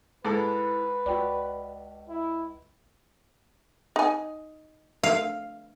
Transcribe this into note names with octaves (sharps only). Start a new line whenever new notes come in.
G#2 E4 A4 B4
C#2 F#4 G4 D5
E4
D#4 G#5
F5